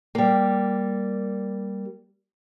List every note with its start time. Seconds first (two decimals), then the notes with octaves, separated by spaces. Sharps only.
0.15 G3 A#3